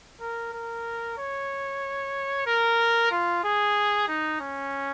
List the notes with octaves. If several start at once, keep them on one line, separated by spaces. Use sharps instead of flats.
A#4
A#4
C#5
A#4
F4
G#4
D#4
C#4